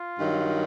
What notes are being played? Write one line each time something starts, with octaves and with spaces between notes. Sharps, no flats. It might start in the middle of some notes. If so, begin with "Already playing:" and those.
Already playing: F4
G2 D#3 F#3